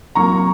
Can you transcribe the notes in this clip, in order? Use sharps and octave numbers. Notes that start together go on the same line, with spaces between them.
C3 F#3 A#3 A#5 C#6